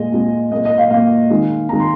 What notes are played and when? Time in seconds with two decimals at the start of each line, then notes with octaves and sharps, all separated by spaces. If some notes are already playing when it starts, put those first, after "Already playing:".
Already playing: A#2 G#3 D#5
0.12 A#2 G#3
0.51 A#2 A#3 D#5
0.65 D#5
0.78 F5
0.91 A#2 A#3 F5
1.30 D#3 G#3
1.69 D#3 G#3 A#5
1.80 C6